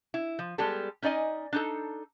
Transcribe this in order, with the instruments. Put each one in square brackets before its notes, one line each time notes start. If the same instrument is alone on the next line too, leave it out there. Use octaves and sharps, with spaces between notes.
[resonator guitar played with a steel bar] E4
F3
G3 G#3 B3 G4 A4
C#4 D#4 D5 D#5 G#5
D4 D#4 A4